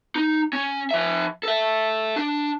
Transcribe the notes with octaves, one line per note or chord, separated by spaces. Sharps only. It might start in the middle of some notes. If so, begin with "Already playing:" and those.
D#4
C#4
F3 E5
A4 E5
D4